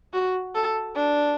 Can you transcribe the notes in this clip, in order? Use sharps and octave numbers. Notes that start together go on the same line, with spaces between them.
F#4
A4
D4